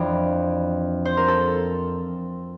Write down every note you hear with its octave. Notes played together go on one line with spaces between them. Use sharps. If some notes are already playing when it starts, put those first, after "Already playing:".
Already playing: F2 E3 D4
C5
A#4
A4